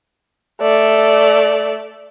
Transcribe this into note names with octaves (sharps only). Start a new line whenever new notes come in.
A3 D5